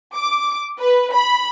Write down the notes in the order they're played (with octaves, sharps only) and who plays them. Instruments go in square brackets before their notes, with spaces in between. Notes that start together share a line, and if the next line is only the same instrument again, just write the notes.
[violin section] D6
B4
B5